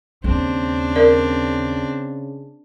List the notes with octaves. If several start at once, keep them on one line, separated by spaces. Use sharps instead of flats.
D#2 C#3 C4 D4
A#4 D5